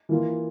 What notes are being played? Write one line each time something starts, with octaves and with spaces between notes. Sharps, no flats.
E3 A#3 F4